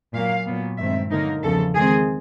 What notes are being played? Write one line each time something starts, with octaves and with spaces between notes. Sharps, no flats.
A#2 F#3 A#3 F5
A#2 F#3 B3
G2 D#3 G#3 C4 E5
D3 F#3 A#3 D#4 A#4
E2 C#3 F3 A4
D#3 G#3 C4 G#4